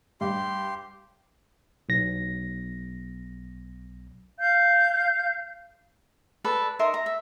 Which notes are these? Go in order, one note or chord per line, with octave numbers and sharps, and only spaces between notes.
G2 G4 C6
B1 A#6
F5 G6
A4 B4 D5
D#4 A#4 E5 C6
A#5
E5